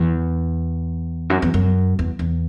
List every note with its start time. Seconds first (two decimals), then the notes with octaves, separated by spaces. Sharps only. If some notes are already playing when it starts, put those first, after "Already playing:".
Already playing: E2
1.30 F#2
1.42 E2
1.54 F#2
1.99 E2
2.19 E2